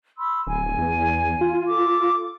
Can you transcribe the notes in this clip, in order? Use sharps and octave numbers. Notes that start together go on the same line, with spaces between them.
B5 C6 E6
D1 G#5
E2
F4
A4 D6